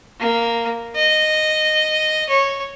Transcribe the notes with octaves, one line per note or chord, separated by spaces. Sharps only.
A#3
D#5
C#5